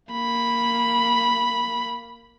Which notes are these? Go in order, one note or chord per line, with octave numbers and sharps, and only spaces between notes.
A#3 B5